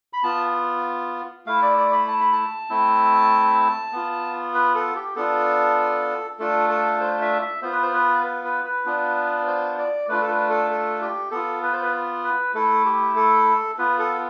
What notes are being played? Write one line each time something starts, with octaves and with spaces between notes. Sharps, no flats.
B5
B3 F4 A5
A3 E4 F5
D5
D5
B5
A5
B5
A5
A3 C4 E4
B3 F4
B4
A4
G4
B3 D4 F4 A4
A3 D4 F4 A4
A4
C5
E5
E5
B3 F4 C5
B4
C5
B4
B4
B4
B4
B3 D4 F4
C5
D5
A3 D4 F4 B4
A4
B4
A4
A4
G4
B3 F4 A4
B4
C5
B4
B4
A3 E4 A4
G4
A4
B3 F4 B4
A4